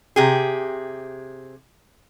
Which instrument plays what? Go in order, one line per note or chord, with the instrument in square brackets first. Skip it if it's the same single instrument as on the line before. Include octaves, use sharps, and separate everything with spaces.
[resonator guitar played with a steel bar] C3 G4 G#4